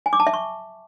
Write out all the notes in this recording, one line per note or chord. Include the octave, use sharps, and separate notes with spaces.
G#5
D6
A5
E5
C#6